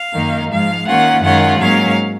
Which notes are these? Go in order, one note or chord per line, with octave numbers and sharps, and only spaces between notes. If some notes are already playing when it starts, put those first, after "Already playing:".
Already playing: F5
F#2 D#3 A#3 D#4
G#2 F3 G#3 F5
D#3 A#3 C#4 F4 F#5
F#2 D#3 G#3 C#4 F4 F#5
G#2 F#3 A#3 C#4 F5